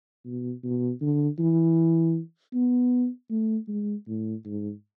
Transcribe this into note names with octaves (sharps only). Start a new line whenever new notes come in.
B2
B2
D3
E3
B3
A3
G#3
A2
G#2